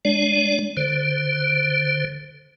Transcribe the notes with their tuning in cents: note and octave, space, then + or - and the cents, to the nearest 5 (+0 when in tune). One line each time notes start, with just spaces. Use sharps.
G#3 +0 D4 +0 D5 -30
D3 +0 C5 +0